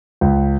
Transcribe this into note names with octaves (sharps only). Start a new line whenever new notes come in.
C#2